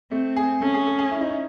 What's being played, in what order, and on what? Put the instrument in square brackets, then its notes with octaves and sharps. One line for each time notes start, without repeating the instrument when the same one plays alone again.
[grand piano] A3 [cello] C4
[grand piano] G#4
[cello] C#4 [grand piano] A4
[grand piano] G#4
A4
G#4
E4
D#4
E4